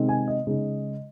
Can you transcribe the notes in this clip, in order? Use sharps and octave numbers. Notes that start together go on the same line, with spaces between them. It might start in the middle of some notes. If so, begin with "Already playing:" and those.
Already playing: C3 D#3 G#3 C4 D#4
G#5
D#5
C#3 G#3 D#4